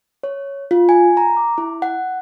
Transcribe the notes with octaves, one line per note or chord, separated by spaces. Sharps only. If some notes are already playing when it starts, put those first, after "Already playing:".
C#5
F4
G#5
A#5
D6
E4
F#5